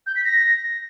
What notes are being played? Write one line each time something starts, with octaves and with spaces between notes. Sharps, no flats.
G6
B6
A#6